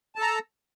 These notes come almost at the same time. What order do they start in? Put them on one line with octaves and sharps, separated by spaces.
A5 A4 A#5